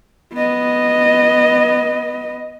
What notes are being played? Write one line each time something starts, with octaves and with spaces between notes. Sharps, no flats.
B3 D#5